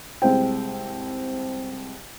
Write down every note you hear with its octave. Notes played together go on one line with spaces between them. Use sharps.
C2 G#3 C5 G5